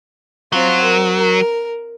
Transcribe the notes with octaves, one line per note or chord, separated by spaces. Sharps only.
F#3 C4 F4
A#4
A#4